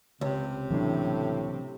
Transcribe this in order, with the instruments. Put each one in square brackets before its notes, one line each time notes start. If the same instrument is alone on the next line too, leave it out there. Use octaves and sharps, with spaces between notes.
[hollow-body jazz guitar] C#2 [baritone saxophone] C3
[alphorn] A2 [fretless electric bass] E3 F#3 D4